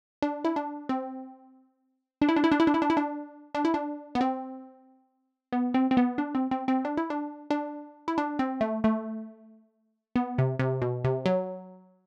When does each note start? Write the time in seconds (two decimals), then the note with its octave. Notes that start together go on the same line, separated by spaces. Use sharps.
0.22 D4
0.45 E4
0.56 D4
0.89 C4
2.22 D4
2.29 E4
2.36 D4
2.44 E4
2.52 D4
2.60 E4
2.67 D4
2.74 E4
2.82 D4
2.90 E4
2.97 D4
3.55 D4
3.65 E4
3.74 D4
4.15 B3
4.21 C4
5.52 B3
5.74 C4
5.91 C4
5.97 B3
6.18 D4
6.35 C4
6.51 C4
6.68 C4
6.85 D4
6.97 E4
7.10 D4
7.50 D4
8.08 E4
8.18 D4
8.39 C4
8.61 A3
8.84 A3
10.16 B3
10.38 C3
10.59 C3
10.82 B2
11.04 C3
11.26 F#3